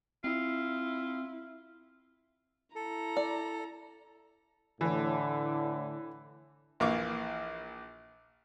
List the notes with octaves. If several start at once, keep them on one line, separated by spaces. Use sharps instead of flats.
C4 E4 F4
E4 A4 A#5
D5
A2 D3 E3
A#1 E3 A#3 F5 C#6 D6